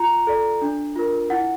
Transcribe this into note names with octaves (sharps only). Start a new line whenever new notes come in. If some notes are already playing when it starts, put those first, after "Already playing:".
Already playing: F4 A#5
A4 D5
D4
F4 A#4
E4 F#5